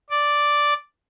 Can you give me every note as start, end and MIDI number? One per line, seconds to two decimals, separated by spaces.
0.10 0.74 74